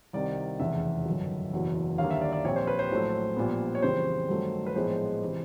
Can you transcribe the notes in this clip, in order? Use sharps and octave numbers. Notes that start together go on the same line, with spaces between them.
C2 C3 D#3 D5
F1 E2 C#3 E5
G1 F#2 D#3 F#3
F#1 E2 B2 F#3
D#2 D3 G3 A#3 F5
E5
D5
D5
A#1 A#2 G3 C4 C#5
C5
B4
C5
A#1 A2 F#3 A3
A#1 A#2 G3 B3
C#5
F2 C#3 E3 G3 C4 C5
G2 D#3 F#3 A3 C4
B4
A#1 A2 F3 G#3 B3 C5
C3 E3